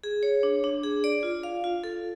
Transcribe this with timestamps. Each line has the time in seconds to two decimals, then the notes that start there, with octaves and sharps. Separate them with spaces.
0.04 G#4
0.23 C#5
0.43 D4
0.64 D4
0.84 G#4
1.04 D5
1.23 F4
1.43 F5
1.64 F4
1.84 A4